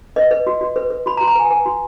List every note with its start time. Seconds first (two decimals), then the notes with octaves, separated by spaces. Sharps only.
0.16 B4 D#5
0.31 B4
0.47 F#4
0.61 F#4
0.76 B4
0.90 B4
1.06 F#4 B5
1.17 A#5
1.21 F#4
1.27 A#5
1.35 B4 G#5
1.50 B4 G#5
1.65 F#4